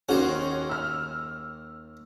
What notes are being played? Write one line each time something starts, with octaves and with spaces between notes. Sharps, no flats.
D#2 C#4 F#4 C5 F#5
E6 F6